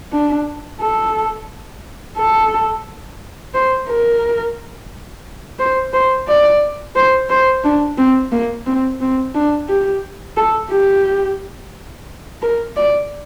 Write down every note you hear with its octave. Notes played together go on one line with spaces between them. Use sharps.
D4
A4
A4
C5
A#4
C5
C5
D5
C5
C5
D4
C4
A#3
C4
C4
D4
G4
A4
G4
A#4
D5